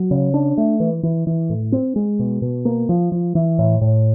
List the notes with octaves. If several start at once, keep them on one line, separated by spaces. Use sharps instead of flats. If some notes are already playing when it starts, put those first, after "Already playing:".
Already playing: F#3
C#3
D4
A3
E3
E3
E3
A2
C4
G#3
B2
B2
A#3
F3
F3
E3
A2
A2